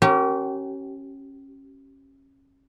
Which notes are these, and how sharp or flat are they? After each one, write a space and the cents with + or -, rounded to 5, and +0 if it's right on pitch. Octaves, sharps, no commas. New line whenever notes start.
C#4 -20 G4 -40 A#4 +0